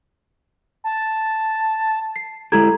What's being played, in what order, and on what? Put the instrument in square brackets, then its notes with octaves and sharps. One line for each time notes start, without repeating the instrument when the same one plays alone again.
[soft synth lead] A5
[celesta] C7
[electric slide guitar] G#3 E4 G4 [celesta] A4 A#5 G#6